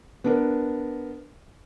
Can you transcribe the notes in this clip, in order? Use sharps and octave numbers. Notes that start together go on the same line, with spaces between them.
B3 D4 A#4